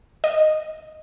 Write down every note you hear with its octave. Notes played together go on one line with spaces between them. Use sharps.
D#5